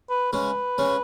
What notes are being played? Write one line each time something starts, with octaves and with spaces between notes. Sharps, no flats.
B4
C#3 G#3 C#4 B4
C#3 G#3 C#4